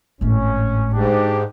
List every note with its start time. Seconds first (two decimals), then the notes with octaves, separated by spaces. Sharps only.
0.21 G#1 A2 C#4
0.93 G#2 D4 G4